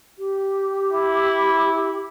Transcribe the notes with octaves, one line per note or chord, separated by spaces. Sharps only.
G4
E4